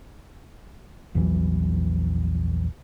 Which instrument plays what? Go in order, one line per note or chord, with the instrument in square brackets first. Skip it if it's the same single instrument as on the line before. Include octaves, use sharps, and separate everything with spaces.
[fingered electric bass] A#1 E2 E3 F#3